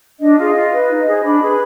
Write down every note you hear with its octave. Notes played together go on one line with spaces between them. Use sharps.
D4 D#5
F4 G#4
F4
B4
D#4
G#4 C5
D4 B5
G#4 B4